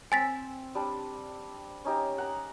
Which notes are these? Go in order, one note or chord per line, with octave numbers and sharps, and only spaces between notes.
C4 G#5 E6 A6 B6
G3 D4
C#4 D#4 G4
F#5 A#5